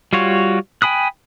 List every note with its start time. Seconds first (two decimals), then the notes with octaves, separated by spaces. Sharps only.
0.13 G3 F4 F#4 C#5
0.82 G5 G#5 B5 D#6 F#6